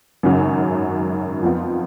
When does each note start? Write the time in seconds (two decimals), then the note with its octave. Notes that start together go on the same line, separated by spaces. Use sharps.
0.23 G#1 F#2 C#3 F#3
1.43 F2 F3 B3 F4